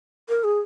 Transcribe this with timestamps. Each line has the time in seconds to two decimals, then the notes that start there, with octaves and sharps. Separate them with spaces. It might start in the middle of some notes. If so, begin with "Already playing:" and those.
0.29 A#4
0.44 G#4